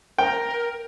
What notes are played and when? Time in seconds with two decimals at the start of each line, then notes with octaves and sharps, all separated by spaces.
0.18 A#4 G5